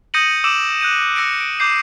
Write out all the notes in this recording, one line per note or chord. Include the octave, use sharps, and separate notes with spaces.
D#6 G6 A#6 C#7 D#7 F#7
D6 E6 D7 E7 F#7
F#6 G6 D#7
E6 A#6 C#7 D7
D7
D6 G6 C7